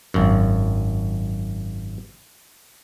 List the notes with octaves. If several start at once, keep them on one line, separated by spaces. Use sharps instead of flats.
G#1 F#2